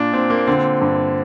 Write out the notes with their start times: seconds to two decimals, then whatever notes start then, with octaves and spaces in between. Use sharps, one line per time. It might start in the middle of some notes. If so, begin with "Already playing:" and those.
Already playing: A#2 D4
0.13 A#2 C4
0.30 A#3
0.47 D3 C4
0.82 G2